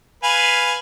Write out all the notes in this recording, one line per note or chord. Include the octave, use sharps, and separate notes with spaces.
B4 F5 G#5